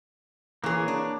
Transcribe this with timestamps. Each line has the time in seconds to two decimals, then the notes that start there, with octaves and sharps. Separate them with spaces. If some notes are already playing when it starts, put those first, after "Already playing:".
0.64 E3 A#3 G#4 C#5
0.88 D4